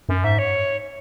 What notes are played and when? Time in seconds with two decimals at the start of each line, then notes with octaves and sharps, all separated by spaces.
0.09 F#2
0.23 G#2 E5
0.39 C#5